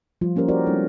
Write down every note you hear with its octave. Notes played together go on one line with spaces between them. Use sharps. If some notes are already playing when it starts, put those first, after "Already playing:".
F3 G3 F4
A#3 C#4 G4 A#4 C5
E4 F#4 G4 A#4 C5 D5
G3 G#3 C4 D4 D#4 A4